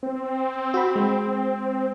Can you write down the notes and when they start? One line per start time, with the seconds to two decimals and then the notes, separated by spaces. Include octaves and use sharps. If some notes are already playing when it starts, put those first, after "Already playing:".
0.03 C4
0.74 F#4 B5
0.96 G#3